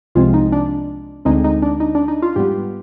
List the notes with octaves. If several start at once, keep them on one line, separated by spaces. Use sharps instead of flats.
C2 C3 F3 G#3 C4 F4
D#4
D4
D2 D3 G#3 C4 D#4
D#4
D4
D#4
D4
D#4
F4
G#2 G3 B3 G4